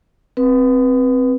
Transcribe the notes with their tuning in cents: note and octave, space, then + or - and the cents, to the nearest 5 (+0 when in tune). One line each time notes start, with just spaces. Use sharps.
C4 +0 B4 -15